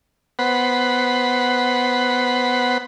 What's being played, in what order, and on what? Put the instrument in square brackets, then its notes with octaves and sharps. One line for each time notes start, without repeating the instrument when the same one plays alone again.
[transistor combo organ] B3 C5 F#5 B5